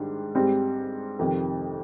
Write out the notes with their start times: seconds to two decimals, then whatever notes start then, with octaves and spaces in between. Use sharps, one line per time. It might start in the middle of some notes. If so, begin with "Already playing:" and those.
Already playing: G#2 D#3 G3 D4
0.35 G#2 G3 C4 G4
1.19 F2 C3 D#3